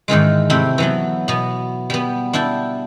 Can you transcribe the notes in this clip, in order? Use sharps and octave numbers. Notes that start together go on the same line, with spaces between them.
G#2 D#3 E3 G#3
C3 A3 E4 G5
E3 F#3 B3
B2 B3
G3 B3
D4 E4 G5 A5